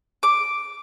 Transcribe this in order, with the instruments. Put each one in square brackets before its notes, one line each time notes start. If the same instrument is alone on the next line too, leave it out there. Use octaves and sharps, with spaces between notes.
[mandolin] D6